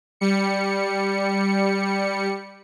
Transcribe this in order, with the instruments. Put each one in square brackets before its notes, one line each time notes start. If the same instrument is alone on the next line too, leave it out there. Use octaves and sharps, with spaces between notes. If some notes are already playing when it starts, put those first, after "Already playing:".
[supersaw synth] G3 C#7